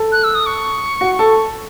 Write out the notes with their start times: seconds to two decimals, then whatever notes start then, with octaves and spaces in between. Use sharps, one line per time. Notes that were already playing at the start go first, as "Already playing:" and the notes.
Already playing: A4
0.12 F#6
0.24 E6
0.35 D#6
0.46 C#6
1.01 F#4
1.19 A4